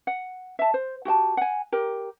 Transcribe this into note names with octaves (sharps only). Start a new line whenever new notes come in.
F#5
E5 A5
C5
F#4 G4 G5 A5
F#5 G#5
G4 A#4